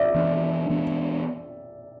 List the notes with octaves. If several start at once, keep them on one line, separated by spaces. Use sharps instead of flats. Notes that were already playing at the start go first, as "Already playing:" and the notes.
Already playing: D5 E5
E3 B3 D4
E3 B3 D4